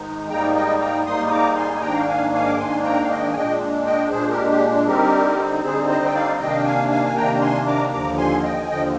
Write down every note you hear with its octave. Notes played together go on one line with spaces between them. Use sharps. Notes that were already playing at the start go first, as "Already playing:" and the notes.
Already playing: G#2 D#3 G#3 D#4
G#2 G3 A#3 D#4 G5 A#5
D#5 G5
G5 A#5
G#2 G3 A#3 D#4 C6 D#6
D#6
A#5 D6
G#5 C6
G#5
G#2 D#3 A#3 D4 G5 A#5
F5
G5
F5 G#5
F5 G#5
D6
G#2 D#3 A#3 D4 G#5 C6
G5 A#5
F5
D#5 G5
G#5
A#2 G#3 D4 D#5 G5
D#5 G5
A#2 G#3 D4 G#4 C5
G4 A#4
G4
D3 G3 C4 D#4 G4 A#4
D3 G3 C4 D#4 G#4 C5
C5 D#5
G5
D5 F5
C3 D#3 A#3 D4 D#5 G5
F5
G5
F5 G#5
F5 G#5
G#5
C3 D#3 A#3 D4 G5 A#5
A#5
G#5 C6
A#5 D6
D#2 D3 F3 A#5 D6
G#5 C6
D#5 G5
G#5
D#2 D3 F3 D#5 G5